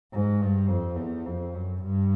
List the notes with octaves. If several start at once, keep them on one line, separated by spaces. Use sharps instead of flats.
G#2
G2
F2
E2
F2
F#2
G2